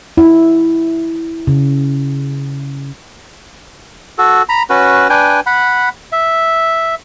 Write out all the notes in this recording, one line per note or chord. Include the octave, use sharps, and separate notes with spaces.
E4
C#3
F#4 A4
A#5 B5
C#4 F#4 B4
D4 B4 G5 G#5
F#5 B5
E5